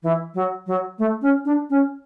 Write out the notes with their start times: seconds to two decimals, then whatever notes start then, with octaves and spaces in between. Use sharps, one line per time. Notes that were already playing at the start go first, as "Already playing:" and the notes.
0.03 E3
0.34 F#3
0.67 F#3
0.99 A3
1.22 C#4
1.45 D4
1.70 C#4